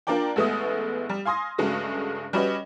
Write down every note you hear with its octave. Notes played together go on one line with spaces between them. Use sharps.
A#3 D4 F4 A#4 D5 G5
A1 G#3 A3 B3 D#6
G3
F5 G#5 C6 D#6 A#6
G2 C#3 G#3 A3 F#4
G3 C#4 F#4 B4 C#5 D#5